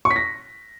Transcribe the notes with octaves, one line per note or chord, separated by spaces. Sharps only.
C#6
B6
A#6